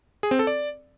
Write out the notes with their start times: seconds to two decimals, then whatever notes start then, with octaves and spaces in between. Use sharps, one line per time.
0.23 G#4
0.31 C4
0.39 A4
0.47 D5